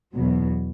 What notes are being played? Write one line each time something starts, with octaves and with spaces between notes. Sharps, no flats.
E2 B2 F#3